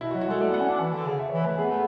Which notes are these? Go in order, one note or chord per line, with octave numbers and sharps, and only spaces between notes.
B2 E4
F#4
F#3
F#4
G#3 A4
A3 D5
B3 F#5
C#4
D4
E3
D3
C#3
E5
C#5
E3
B4
A3 E5
B3 G#4
A3